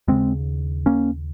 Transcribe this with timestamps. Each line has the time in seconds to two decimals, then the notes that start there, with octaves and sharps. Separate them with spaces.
0.08 D#2 C#3 G#3 C4
0.86 A#3 C#4